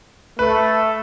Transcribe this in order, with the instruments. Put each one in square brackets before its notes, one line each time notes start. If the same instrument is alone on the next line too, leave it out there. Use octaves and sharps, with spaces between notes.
[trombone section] A3 [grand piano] B4